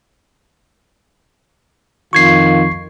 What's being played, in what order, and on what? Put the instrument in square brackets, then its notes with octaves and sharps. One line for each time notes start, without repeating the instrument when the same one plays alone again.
[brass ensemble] F2 D#3 F4 [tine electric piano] C#6 G#6 C7